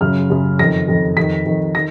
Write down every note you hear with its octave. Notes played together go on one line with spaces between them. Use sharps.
F#2 C#3 F6
F#2 C#3
F2 D#3 A#6
F2 D#3
F2 D#3 B6
F2 D#3
D#3 A#6